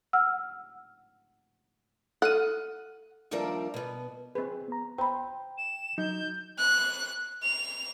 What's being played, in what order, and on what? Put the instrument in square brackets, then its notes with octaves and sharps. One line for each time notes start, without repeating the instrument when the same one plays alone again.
[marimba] F#5 E6 F6
[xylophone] A4 F6 D#7 [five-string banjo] F#5
[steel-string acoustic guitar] D#2 F3 G3 D4 A#4 E5
B2 B3
[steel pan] C4 B4 [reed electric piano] G#4
[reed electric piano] B3 A#5
[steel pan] C5 [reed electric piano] G5 [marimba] A#5 B5
[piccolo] E7
[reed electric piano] F#3 [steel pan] D#4 [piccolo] G6
[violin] F#6
F7